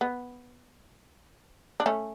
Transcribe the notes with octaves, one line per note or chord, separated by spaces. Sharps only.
B3
D4
A3 C#4